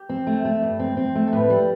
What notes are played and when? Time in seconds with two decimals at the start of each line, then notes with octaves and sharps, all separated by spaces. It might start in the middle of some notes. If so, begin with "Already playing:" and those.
Already playing: G4
0.09 C4
0.27 A3
0.45 A3
0.62 G2
0.79 C4
0.97 C4
1.15 A3
1.27 A4
1.33 A2 B4
1.50 G3